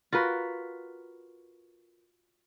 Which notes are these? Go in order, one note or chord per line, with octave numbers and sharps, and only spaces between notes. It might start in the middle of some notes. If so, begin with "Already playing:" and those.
F4 F#4 A#4 B4